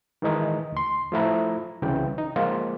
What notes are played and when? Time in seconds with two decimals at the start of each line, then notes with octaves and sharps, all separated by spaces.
0.22 D#3 E3 G#3 D#4
0.72 D2 C6
1.12 F3 A3 E4 A#5
1.82 C2 C#3 E3 G5
2.18 D#4
2.36 F3 G#3 A#3 F4